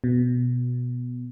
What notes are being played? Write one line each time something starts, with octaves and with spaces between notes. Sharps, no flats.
B2